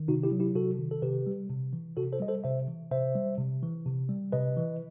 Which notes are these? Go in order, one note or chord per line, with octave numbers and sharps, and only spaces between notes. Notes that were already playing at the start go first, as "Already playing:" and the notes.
Already playing: D#3
C3 D#4 F#4
E4 G4
F#3
E4 G4
C3 F#4 A4
D#3
A4
C3 G4 B4
G3
C3
E3
C3 F#4 A4
A4 C5
G3 D#5
A4 C5
C3 C5 E5
E3
C3 C5 E5
G3
C3
E3
C3
G3
C3 B4 D#5
E3